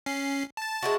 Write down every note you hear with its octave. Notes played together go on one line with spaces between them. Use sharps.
C#4 C7
A5 A6
G#3 E4 F#4